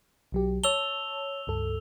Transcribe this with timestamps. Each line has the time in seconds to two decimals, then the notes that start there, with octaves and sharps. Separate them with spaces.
0.32 B1 F#3 G4
0.64 C#5 A5 E6 F7 G7
1.47 C#2 G2 A4